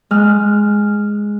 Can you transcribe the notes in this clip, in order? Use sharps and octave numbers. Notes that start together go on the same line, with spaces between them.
G#3 F6